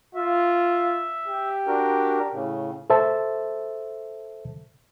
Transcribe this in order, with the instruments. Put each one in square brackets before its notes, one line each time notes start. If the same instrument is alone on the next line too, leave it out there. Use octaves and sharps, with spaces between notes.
[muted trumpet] F4 [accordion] E5
[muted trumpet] G4
[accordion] D4 F#4 A#4
A2 C#3
[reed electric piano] A4 C5 E5 A5